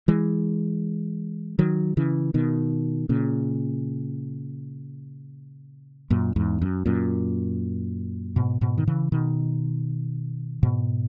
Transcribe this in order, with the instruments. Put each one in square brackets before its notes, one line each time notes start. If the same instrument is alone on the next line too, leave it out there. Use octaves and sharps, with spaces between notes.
[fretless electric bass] E3 G#3
D#3 F#3
C#3 E3
B2 D#3
A#2 C#3
F#2 A#2
E2 G#2
F#2
F#2 A#2
G#2 B2
G#2 B2
D#3
C#3 E3
B2 D#3
G#2 B2